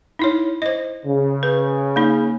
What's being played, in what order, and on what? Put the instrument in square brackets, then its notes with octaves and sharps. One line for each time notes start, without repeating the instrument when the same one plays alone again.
[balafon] D#4 E4 C#5
C5 D#5
[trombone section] C#3
[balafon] B4
A#3 D#4